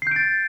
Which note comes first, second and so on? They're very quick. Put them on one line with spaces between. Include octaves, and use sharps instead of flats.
C7 G6 D7 A6